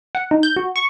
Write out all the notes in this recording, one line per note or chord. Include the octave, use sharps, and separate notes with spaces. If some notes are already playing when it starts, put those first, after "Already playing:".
F#5
D#4
G6
F#4
C#6